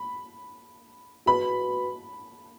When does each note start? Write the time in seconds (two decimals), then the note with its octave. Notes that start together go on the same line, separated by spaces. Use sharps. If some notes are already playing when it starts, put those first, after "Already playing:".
Already playing: B5
1.26 F#4 B4 D#5 B5